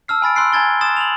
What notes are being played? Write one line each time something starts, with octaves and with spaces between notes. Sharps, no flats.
A5 E6 F6 C7
G#5 B5 A6 D7
B5 C6 E6 F#6 C7 D7
G#5 A#5 G#6 A6 G7
C6 D#6 A6 E7
F7 F#7